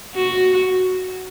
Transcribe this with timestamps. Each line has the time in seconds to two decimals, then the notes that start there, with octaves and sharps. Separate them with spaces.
0.15 F#4